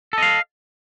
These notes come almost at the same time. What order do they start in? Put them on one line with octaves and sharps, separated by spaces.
A4 D#5 F5